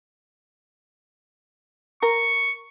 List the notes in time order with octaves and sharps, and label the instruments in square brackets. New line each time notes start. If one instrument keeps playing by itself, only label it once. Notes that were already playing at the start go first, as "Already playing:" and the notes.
[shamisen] A#4 [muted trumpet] C#6